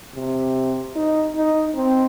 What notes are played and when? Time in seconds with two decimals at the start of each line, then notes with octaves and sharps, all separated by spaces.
0.15 C3
0.96 D#4
1.36 D#4
1.76 C4